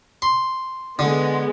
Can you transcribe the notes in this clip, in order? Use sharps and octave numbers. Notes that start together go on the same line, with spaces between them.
C6
D3 G#3 B3